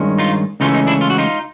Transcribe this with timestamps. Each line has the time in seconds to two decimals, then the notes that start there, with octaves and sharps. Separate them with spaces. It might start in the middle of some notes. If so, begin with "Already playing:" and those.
Already playing: G2 D#3 G#3 C#4
0.19 D#4 F4
0.60 C#2 C#3 E3 A3 C#4 D#4 F4
0.74 D#4
0.87 D4 E4
1.01 F4
1.10 F#4
1.18 D#4 F4